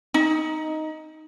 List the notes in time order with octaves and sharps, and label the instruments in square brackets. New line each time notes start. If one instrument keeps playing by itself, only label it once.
[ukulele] D#4